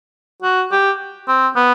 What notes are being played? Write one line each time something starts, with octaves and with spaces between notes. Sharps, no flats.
F#4
G4
C4
B3